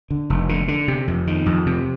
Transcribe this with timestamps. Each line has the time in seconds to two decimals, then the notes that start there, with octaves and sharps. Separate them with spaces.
0.11 D3
0.30 F1
0.49 D3
0.68 D3
0.88 C3
1.08 F2
1.27 D#3
1.46 F2
1.66 C3